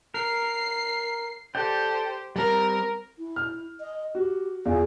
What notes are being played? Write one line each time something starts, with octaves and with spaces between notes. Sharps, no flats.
A#4 C7
G4 A4 C5 D5 G5
G3 C4 A#4
E4
F6
D#5
F#4 G4
E2 F4 G#4